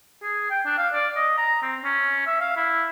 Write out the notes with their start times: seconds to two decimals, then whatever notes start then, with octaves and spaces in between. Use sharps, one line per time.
0.23 G#4
0.51 G5
0.66 D4
0.78 F5
0.94 D5
1.16 D#5
1.38 A#5
1.62 C4
1.85 C#4
2.27 E5
2.40 F5
2.57 E4